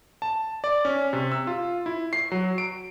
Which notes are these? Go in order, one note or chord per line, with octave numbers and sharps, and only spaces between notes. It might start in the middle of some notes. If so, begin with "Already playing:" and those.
A5
D5
C#4
C3
E6
F4
E4
C7
F#3
D7